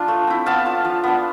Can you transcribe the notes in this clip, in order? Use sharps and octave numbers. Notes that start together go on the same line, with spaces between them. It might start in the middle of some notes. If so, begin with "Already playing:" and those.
Already playing: F3 D4 F4
A3
C4 E4
B3 F5 A5
D4 F4
F3
B3 D4